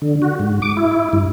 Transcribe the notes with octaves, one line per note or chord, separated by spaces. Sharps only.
D3
F#4
G#2
D6
E4
G2